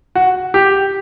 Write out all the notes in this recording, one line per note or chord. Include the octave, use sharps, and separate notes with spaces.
F#4
G4